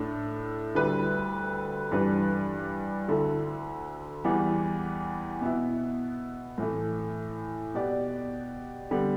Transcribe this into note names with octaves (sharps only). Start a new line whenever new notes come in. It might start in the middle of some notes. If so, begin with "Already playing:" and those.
Already playing: A2 A3 D4 A4
D2 D3 G3 E4 B4
G2 E3 G3 D4 B4
D2 D3 A3 E4 A4
E2 E3 G3 B3
B2 B3 E4
A2 E3 A3
B2 B3 G4 D5
D3 G3 B3 G4